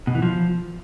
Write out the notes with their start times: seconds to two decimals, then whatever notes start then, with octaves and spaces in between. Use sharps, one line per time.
0.07 B2
0.15 E3
0.22 F3